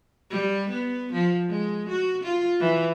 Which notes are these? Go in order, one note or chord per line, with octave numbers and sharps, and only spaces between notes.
G3
B3
F3
G#3
F#4
F4
E3